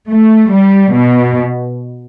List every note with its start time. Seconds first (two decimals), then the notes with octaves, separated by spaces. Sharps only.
0.10 A3
0.53 G3
0.94 B2